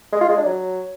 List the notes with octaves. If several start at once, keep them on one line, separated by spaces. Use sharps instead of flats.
G#3
F4
G#3
D4
F#3